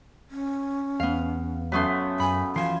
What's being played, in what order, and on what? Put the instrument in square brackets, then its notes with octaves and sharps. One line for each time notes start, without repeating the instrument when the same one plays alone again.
[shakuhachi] C#4
[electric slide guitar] E2 [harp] B3 F5
[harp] F#2 C#4 C6 [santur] A3 B3 B4
[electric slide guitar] F#2 [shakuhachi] G#5 [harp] B5
[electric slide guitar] E3 F3 [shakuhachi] F5 [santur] G#5 C6